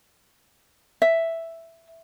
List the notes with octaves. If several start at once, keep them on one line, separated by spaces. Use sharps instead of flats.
E5